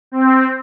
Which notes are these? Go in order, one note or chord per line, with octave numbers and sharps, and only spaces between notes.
C4